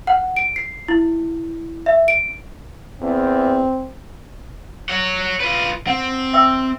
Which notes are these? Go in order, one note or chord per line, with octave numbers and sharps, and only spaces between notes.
F#5
D7
C7
E4
E5
D7
E2 C4
C#5 F#5
F4 B4
C4 F#5
E5 G5 E6